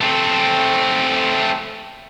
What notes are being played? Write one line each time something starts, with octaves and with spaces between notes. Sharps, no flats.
A3 C4